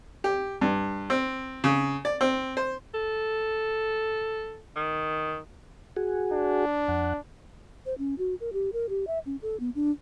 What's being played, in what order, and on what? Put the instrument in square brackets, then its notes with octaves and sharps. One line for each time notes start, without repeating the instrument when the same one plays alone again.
[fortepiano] G4
G2
C4
C#3
D5
C4
C5
[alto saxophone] A4
D#3
[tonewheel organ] F#4 G#4
[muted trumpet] D4
[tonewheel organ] F2 F#5
[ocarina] C5
C#4
F#4
A#4
G4
A#4
G4
E5
C#4
A4
B3
D4